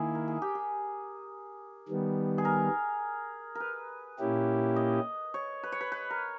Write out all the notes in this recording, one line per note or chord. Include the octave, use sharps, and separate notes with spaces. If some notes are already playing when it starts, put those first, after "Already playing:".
Already playing: D#3 A#3 E4 G#4
A#4
G#4
G4
G#4
D#3 G3 B3
G#4
A#4
A#4 B4
A#2 A#3 C#4 E4 G4
D#5
C#5
B4
C#5
B4
B4
A#4